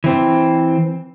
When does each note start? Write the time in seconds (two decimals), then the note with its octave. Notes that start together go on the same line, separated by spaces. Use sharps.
0.04 E3 C4